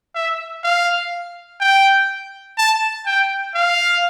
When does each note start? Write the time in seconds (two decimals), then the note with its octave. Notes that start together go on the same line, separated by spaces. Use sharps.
0.15 E5
0.63 F5
1.60 G5
2.58 A5
3.06 G5
3.55 F5